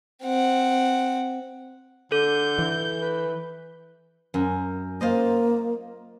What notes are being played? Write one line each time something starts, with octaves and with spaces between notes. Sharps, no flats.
C4 F#5
D3 A4 G6
E3
B4
F#2
A#3 F4 C5 D#5